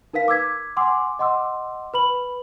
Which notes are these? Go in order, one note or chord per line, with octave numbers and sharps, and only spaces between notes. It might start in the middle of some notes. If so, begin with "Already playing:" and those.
D#4 A#4 B4 F5 B6
D6 E6 G#6 B6
F#5 G#5 C6 D6 E6
D#5 F#5 C6 D6 E6
B4 B5 F#7